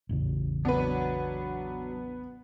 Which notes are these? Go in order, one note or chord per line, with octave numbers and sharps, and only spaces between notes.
A1 E2 C#3
F#3 B3 D4 B4